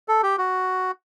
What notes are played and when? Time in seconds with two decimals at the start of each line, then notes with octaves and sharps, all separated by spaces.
0.08 A4
0.23 G4
0.38 F#4